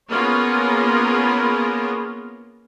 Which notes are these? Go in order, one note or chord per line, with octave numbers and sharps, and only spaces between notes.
A#3 B3 C#4 F4 G#4 A#4